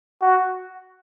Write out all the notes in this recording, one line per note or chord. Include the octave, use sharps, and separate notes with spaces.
F#4